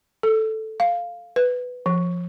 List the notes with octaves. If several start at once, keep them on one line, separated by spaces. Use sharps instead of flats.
A4
F5
B4
F3